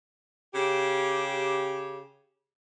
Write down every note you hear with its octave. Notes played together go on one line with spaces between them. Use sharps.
C#3 G4